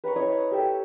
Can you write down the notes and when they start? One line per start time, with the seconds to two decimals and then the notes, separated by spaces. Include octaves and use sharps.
0.04 B4 A#5 B5 C#6
0.16 E4 C#5 D#5 D#6
0.51 G4 A4 E5 G5